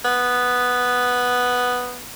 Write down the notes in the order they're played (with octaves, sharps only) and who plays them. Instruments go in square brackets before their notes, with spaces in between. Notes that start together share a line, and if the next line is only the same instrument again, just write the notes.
[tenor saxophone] B3